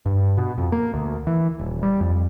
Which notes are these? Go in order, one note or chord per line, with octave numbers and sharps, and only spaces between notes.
G2
B2
F2
A#3
D2
E3
D#1
G3
F2